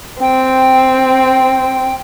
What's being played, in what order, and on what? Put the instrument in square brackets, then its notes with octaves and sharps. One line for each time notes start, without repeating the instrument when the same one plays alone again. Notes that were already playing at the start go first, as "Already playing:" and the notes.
[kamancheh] C4 [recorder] G5